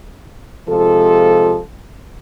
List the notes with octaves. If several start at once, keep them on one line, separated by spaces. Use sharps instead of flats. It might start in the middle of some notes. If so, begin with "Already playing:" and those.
C3 F3 G#3 F4 A4